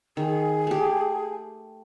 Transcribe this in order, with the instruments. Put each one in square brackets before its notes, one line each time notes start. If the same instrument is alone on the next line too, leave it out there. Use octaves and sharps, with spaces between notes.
[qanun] D#3 [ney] G#4
[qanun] A3 G4